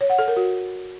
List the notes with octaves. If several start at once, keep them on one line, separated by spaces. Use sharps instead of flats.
C#5
F#5
A4
A#4
F#4